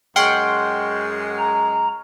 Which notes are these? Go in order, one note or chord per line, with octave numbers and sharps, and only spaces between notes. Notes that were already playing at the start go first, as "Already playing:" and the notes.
F#2 G#3 F#5 G5 C6 C#6 F6
A#5